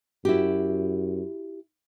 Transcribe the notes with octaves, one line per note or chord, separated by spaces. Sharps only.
F#2 E4 F#4 G4